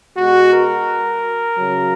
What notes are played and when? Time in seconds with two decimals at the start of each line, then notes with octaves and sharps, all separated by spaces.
0.17 B2 G#3 F#4
0.52 A#4
1.57 C#3 F#3